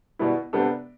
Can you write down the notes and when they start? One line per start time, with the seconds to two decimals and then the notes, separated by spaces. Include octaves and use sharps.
0.19 B2 G3 B3 E4
0.53 C3 G3 B3 D4 A4